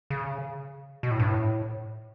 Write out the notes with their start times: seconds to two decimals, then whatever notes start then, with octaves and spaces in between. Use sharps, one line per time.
0.10 C#3
1.03 B2
1.11 A2
1.19 G2
1.27 A2